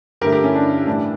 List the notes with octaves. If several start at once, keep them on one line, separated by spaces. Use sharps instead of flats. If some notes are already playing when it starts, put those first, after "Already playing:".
G2 D3 A3 G4 A#4
G4 A#4
C#4 E4
D4
A2 E3 G3 D4